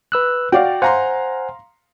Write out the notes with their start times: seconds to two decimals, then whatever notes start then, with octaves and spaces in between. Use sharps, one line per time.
0.12 B4 E6 F#6
0.52 F#4 D5 F5 G5
0.82 C5 F5 F#5 G#5 A#5 C6